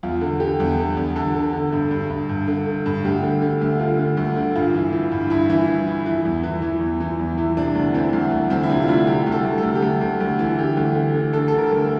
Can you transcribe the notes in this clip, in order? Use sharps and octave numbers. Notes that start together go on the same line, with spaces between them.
E2 F4
D3
D3 G4
E2
D3
E2
D3 A4
D3
D3
G2
G2
G2
G2
D3
D3
G2
D2 G4
D3
D3
D2
D3 F4
D3
D2
D3
G2 F4
E3
E3
G2
G2 E4
E3
E3
E3
E3
E2
E3
E3
E2
E3
E2
E3
C3 D4
D2
E3 C4
D2
D2
D2 C4
E4
C3 D4
F4
D2 E4
C3 G4
D2
A4
D2
A4
D2
G4
D2 A4
D2
D2
E3
D3 G4
D2
D3
D3
D3 A4
D3 A4
A#4
D2
A4